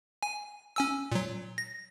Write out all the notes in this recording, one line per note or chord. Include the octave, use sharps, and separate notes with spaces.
G#5
C#4 G#5 E6
A#2 F#3
A#6